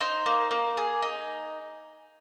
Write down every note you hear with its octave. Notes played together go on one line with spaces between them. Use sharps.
D#4 C5
A#3
A#3
G#4
D#4